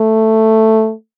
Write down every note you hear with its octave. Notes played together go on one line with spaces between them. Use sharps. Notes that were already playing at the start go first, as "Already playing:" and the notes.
Already playing: A3